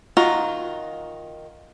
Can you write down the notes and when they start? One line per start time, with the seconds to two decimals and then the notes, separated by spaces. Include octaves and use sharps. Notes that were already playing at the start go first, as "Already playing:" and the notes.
0.17 D#3 F4 F#4 A#5